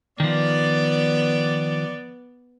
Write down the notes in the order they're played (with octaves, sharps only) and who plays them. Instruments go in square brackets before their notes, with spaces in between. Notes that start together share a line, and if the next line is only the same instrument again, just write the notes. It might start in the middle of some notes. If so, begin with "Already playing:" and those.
[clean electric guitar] D#3 F3 [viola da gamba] B3 [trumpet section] D5